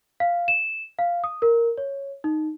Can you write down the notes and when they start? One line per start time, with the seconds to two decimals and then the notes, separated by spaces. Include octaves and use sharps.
0.20 F5
0.48 E7
0.99 F5
1.24 D#6
1.42 A#4
1.78 C#5
2.24 D#4